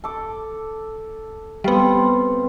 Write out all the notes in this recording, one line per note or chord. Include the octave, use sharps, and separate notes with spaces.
A4 D6
G3 B3 C4 B4 F5